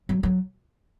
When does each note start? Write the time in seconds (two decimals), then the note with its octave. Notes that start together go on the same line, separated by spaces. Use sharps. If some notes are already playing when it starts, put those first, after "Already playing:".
0.09 F#3
0.23 F#3